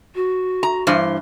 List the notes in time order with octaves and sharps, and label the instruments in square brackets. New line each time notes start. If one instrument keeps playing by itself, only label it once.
[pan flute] F#4
[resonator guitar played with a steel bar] A#5
G2 E3 C5